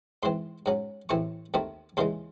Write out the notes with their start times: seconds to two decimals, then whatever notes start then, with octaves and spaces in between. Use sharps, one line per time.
0.23 G#2 E3 C4 C6
0.66 G#2 F#3 C#4
1.09 A1 A2 E3 C4 C#6
1.54 D#2 D#3 A3 C4
1.97 D#2 C#3 E3 G#3 C6